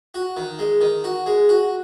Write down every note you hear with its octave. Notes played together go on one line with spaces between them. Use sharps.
F#4
D#3
G#3
D#3
F#4
G#3
F#4